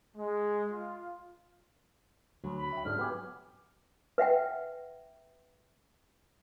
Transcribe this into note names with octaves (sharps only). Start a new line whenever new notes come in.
G#3
F4
D2 F#3
B5
E5 G5
G#2 D3 F6
B3 G4 G#5
B4 E5 F#5 G5